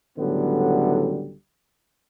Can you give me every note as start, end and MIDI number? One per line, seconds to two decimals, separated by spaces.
0.18 1.35 37
0.18 1.35 45
0.18 1.35 50
0.18 1.35 54
0.18 1.35 55
0.18 1.35 59